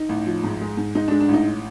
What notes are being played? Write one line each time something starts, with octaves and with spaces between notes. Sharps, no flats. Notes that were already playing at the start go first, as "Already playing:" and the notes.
Already playing: D#4
A1
F3
G#2
G#3
G#2
G#2 D#4
G#3 D4
D4
A1 D#4